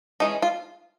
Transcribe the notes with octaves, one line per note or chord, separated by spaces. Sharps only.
E3 G#3 C#4 D#4
F4